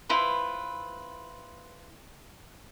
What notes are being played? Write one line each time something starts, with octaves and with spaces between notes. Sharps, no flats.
E4 F4 B4 C5